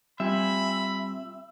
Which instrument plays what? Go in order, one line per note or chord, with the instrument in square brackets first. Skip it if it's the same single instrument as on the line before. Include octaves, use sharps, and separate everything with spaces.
[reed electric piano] G3 [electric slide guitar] C4 F4 G#5 [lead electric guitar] E5 [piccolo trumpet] B5